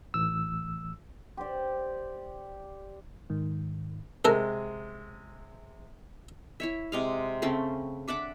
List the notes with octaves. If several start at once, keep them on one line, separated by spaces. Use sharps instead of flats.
A1 E6
G4 C5 D5
G#2 D#3
C3 G#3 A4 A#4
E4 C#5 E5
C3 G#3 F5
C#3 A3 C4 C#4
D4 E5 F#5 D6